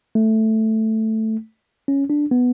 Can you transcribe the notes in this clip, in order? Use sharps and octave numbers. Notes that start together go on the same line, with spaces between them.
A3
C#4
D4
B3